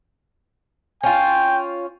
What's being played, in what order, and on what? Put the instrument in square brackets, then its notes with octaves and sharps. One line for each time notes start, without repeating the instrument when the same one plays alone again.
[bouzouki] C#4 F4 [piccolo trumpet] G5